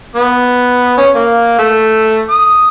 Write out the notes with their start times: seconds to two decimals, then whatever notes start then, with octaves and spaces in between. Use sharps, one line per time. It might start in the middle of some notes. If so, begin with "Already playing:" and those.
0.16 B3
0.98 C#4
1.15 A#3
1.59 A3
2.30 D#6